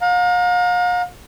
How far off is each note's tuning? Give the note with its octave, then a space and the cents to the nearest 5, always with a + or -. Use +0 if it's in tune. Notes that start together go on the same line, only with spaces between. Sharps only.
F5 +40 A#5 +0